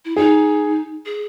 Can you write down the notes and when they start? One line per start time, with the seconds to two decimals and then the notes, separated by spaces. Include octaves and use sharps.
0.05 E4
0.17 D#4 G#4
1.05 G#4